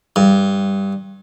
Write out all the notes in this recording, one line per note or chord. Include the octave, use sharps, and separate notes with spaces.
G2